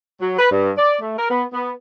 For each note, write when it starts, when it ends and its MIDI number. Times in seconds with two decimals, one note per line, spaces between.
0.21 0.37 54
0.38 0.49 71
0.51 0.70 43
0.77 0.96 74
1.01 1.15 57
1.17 1.29 70
1.30 1.44 59
1.52 1.72 59